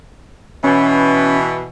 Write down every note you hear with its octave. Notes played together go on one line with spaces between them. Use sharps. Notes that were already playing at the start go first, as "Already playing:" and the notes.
B2 E3 C#4